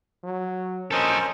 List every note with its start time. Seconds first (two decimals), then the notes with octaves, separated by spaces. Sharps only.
0.24 F#3
0.91 A#1 C#4 A4 A#4 C5 D#5